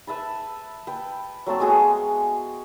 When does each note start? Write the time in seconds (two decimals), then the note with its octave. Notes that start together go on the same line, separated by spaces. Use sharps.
0.07 B4 E5 A5 B5
0.87 B4 G5
1.46 F#3 A3 C4 A5
1.60 G#3 B3 F#4 G#4